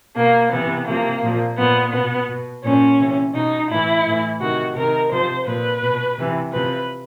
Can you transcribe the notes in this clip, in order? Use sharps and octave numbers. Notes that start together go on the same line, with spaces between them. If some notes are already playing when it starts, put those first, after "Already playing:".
B2 A#3
C3 E3 B3
C3 F3 A#3
A#2 F3
A#2 F3 B3
B2 B3
B2
A#2 F3 C#4
C3 E3
B2 D#4
A2 E3 E4
A2 E3
C3 D#3 F#4
C3 D#3 A#4
C3 F3 C5
A#2 F3 B4
B2
C3 E3
C3 F3 B4